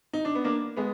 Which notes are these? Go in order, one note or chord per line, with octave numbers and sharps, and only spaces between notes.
D#4
D4
B3
A#3 D4
G#3 B3